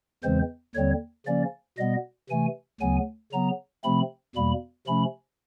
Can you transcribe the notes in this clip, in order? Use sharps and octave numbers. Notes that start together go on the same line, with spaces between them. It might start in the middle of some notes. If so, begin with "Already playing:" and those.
E2 C#3 E3 G#3 C4 C5
D#2 D3 G3 C4 C#5
C#3 F3 A#3 C#4 D5
B2 G3 B3 D#5
C3 E3 A3 G#5
D2 C#3 F#3 B3 G#5
C#3 F#3 B3 A#5
C3 F3 A3 C4 B5
E2 B2 G3 A#3 B5
C3 F3 A3 C#4 B5